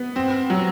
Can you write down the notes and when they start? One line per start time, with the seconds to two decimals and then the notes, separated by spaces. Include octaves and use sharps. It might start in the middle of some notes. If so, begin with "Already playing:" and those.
Already playing: B3
0.16 C4
0.50 F#3